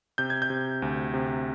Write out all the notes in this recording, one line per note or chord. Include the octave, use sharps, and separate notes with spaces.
C3 G6
G#6
G6
C3
D2
C3